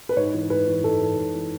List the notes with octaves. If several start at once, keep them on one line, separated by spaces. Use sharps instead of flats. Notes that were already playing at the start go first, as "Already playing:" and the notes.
B4
G#2 C#5
E3
G#2 B4
E3
G#2 A4
E3
G#2
E3